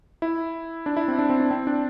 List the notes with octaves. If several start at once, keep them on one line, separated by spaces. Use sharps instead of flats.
E4
D4
E4
C4
D4
C4
D4
C4
D4